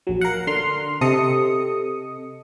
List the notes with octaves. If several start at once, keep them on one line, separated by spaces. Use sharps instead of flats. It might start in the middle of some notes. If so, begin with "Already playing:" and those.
A#1 F#3
A#4 F5 F#5
D3 C6 F6
C3 A4 D#5 D#6 C#7